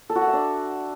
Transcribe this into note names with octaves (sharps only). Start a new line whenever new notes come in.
A4
F#4
F#5
E5
D4